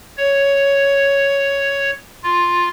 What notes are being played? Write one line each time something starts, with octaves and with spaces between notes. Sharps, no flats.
C#5
F4